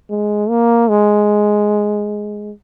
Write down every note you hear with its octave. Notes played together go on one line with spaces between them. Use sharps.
G#3
A#3
G#3